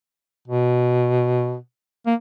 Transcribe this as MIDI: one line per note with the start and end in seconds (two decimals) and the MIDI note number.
0.48 1.57 47
2.06 2.14 58